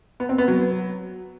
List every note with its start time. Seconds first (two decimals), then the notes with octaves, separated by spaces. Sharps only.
0.20 B3
0.29 C4
0.38 B3
0.48 F#3